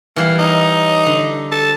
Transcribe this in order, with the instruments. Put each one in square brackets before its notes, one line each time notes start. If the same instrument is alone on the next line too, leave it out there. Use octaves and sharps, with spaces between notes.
[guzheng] E3 G3 F5 [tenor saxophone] A#3
[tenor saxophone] D#4
[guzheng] D3
[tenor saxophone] A4